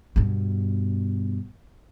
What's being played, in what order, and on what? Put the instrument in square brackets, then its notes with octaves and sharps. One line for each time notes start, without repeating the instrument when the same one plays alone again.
[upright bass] G2 B2